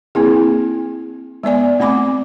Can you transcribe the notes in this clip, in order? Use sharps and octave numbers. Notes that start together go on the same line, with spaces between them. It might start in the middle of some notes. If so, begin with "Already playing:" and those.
A#3 C4 E4 G#4
G#3 B3 D5 G#5
A3 C4 G#5 B5 D6